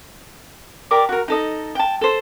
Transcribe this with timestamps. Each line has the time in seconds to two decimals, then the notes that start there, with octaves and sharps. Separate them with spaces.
0.91 G4 A#4 D5 D6
1.09 F#4 A#4
1.28 D#4 A4 D#5
1.75 G5 A5
2.01 A4 C5